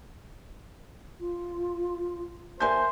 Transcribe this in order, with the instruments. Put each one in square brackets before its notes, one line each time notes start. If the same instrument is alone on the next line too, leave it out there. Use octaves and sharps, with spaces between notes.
[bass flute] F4
[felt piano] A#4 G#5 G6 [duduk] C5 [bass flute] E5